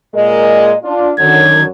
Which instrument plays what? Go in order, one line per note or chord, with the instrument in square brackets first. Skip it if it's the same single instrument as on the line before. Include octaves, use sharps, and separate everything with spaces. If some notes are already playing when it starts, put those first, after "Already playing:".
[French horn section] A#2 G#3 A#4 [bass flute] D#5
[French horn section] D4 F4
[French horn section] F#2 D3 F#3 [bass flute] D#3 [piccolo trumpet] G#6